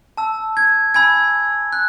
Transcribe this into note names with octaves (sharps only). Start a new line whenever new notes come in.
A5 E6
G#6
G#5 B5 E6 G#6
F#6